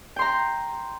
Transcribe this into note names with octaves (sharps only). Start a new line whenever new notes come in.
G5 A#5 C6